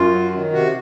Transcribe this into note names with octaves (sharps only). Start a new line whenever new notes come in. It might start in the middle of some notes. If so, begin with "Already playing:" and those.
Already playing: F#2 F4
F#3
D#3
C3 F#4